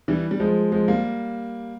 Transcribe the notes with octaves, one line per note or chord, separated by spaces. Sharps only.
E3 G3
G3
F3 G#3
F3 G#3
G3 A#3